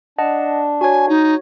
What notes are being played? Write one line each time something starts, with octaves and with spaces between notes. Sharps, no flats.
D4 D#5 F#5 A5
F#4 C#5 G#5
D#4